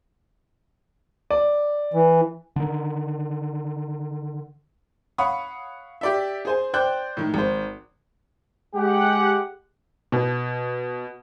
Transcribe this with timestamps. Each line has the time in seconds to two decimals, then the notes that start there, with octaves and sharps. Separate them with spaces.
1.30 D5
1.94 E3
2.56 D3 D#3
5.18 C#5 F5 F#5 B5 C#6 D#6
6.01 G4 D5 E5
6.45 G#4 C5 G#5
6.74 C5 D5 G5 F#6 G6
7.17 A2 D#3
7.34 G#1 C5
8.75 G#3 G4 F#5
10.12 B2